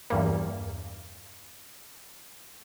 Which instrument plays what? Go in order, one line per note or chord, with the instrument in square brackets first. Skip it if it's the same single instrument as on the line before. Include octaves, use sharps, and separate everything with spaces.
[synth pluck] E2 G2 A#3